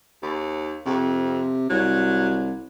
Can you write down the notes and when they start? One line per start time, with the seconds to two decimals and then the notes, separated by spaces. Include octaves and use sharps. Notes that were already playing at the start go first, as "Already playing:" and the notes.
0.22 D#2
0.86 F2 C3
1.70 C2 F#3